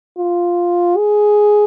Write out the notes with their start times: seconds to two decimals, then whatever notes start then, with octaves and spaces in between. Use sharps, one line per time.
0.18 F4
0.97 G#4